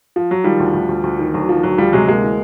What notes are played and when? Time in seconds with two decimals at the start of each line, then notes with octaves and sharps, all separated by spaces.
0.16 F3
0.31 F#3
0.44 D#3 F3 G3
0.60 D2
0.74 D2
0.89 D2
1.03 D2
1.19 D#3
1.34 D2 F#3
1.48 D#3 F3
1.63 D2 F#3
1.78 D2 F3 G3
1.93 C3 F#3 G#3
2.08 D2 G#3 A#3
2.24 E3